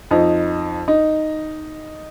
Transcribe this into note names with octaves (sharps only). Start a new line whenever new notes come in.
F2 D#4
D#4